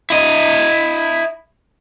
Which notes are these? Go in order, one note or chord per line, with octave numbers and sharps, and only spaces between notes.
E4 D#5